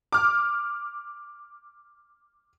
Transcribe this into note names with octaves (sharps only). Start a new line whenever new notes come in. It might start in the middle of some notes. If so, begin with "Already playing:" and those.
D6 F6